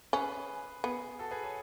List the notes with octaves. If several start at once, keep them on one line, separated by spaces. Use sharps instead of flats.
C#4 G#4 B4
B3 G#4
F#4 A4
G#4 B4
A4 C#5